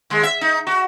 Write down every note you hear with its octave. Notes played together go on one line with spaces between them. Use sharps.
D#2 G#3
E5
D#4
F#4